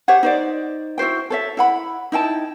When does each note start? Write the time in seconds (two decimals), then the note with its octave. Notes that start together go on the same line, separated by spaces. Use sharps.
0.08 G4 C5 C#5 F#5
0.23 D#4 C5 D5
0.98 E4 F#4 C5 G5
1.30 A4 C#5 E5
1.57 E4 F#5 B5
2.12 D#4 E4 G5 A5